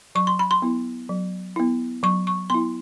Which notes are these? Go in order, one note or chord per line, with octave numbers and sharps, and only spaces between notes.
F#3 C#6
C6
B5
C6
B3 E4
F#3
B3 E4
F#3 C#6
C#6
B3 E4 C6